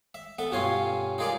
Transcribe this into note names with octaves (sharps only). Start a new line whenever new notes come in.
E5
B3 A4 E5
G2 B2 C#4 F4 G#5 C6
D#4 F4 G#4 A#4 D5